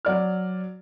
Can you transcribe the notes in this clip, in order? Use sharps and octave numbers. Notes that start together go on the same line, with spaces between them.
F#3 D5 F6